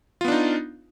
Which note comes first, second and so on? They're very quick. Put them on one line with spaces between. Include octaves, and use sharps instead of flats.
F4 B3 D4 D#4